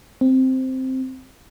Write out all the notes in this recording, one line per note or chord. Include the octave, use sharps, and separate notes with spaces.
C4